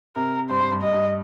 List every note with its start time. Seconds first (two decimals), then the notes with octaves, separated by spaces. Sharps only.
0.16 C3 A#4
0.49 G2 C5
0.60 G2
0.72 G2
0.82 G2 D#5
0.93 G2